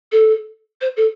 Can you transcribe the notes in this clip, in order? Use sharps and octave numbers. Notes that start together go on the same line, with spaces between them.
A4
C5
A4